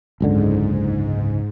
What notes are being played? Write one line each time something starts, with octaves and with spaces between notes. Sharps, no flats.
F#1 C#2 G#2 D3